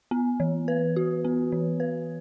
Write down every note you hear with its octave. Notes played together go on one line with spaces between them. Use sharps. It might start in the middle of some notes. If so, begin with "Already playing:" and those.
B3
E3
B4
F#4
B3
E3
B4